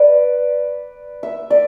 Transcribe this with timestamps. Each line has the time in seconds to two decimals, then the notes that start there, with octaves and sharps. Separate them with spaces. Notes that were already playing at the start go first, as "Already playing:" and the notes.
Already playing: B4 D5
1.23 E5
1.50 D5